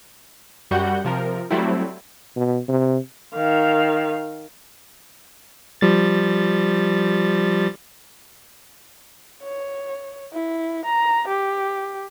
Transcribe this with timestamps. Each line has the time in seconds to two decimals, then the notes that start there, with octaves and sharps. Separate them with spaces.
0.71 F#2 G3 F#4 F#5 G6
1.05 C3 F3 A#4
1.50 F#3 G3 A3 C4 E4
2.36 B2
2.69 C3
3.35 D#3 F5
5.81 F3 G3 A6
9.43 C#5
10.32 E4
10.85 A#5
11.28 G4